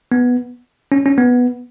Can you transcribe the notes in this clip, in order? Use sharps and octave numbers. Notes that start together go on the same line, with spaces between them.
B3
C#4
C#4
B3